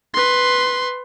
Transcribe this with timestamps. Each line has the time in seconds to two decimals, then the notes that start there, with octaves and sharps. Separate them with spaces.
0.14 B4 C6